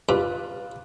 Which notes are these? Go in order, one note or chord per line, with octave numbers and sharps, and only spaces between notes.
G2 F4 B4